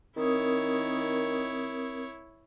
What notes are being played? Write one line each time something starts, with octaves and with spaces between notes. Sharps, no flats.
D#3 C4 E4 A#4 C#5 D#6